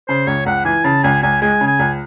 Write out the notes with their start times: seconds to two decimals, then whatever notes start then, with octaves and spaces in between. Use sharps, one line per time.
0.09 C#3 C5
0.27 C#2 C#5
0.46 C#2 F#5
0.65 E3 G#5
0.84 C#3 A5
1.04 C#2 G#5
1.23 C#2 G#5
1.42 G#3 G#5
1.61 C#3
1.67 G#5
1.79 C#2